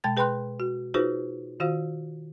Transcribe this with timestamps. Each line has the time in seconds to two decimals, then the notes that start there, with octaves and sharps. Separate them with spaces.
0.04 B2 G#3 G5 A5 A6
0.17 G#4 B4 G5 B5 C6 F#6
0.60 F#4
0.94 D#4 F4 F#4 G#4 B4 C5
1.60 D#3 F4 F#4 C5 F5